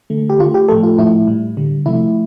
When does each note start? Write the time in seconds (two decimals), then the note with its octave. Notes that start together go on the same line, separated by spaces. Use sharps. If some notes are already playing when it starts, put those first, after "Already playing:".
0.10 D3 A3
0.30 G4
0.39 D3 A3 F4
0.54 G4
0.68 A2 F3 A3 A4
0.83 F4
0.98 A2 F3 A3 E4
1.27 A2 G3
1.57 D3 G3
1.86 C3 F3 A3 E4